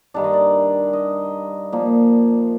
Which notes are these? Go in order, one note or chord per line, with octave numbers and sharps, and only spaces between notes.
G2 D#3 G3 D4 D5
D#5
D5
D#5
A#2 F3 A#3